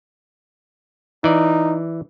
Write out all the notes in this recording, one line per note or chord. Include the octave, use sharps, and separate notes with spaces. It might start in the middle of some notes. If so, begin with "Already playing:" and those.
E3 D#4 D5